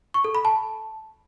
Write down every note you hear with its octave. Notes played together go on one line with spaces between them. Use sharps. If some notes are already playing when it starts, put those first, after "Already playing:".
C#6
A4
B5
A5